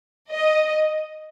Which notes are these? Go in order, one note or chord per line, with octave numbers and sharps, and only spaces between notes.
D#5